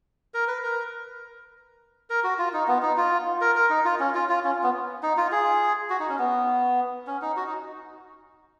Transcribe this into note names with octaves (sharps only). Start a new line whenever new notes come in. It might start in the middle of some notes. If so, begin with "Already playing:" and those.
A#4
B4
A#4
A#4
F#4
F4
D#4
B3
D#4
F4
A#4
A#4
D#4
F4
C#4
F4
F4
C#4
B3
D#4
F4
G#4
F#4
D#4
C#4
B3
C#4
D#4
F#4
D#4